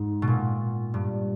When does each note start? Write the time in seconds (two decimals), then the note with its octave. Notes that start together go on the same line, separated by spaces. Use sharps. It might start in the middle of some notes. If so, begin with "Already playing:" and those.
Already playing: G#2
0.22 B2
0.28 A#2
0.94 G2